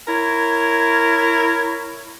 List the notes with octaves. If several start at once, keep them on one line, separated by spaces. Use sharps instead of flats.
E4 A#4 C#5